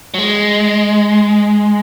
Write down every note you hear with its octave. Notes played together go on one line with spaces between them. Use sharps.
F#3
G#3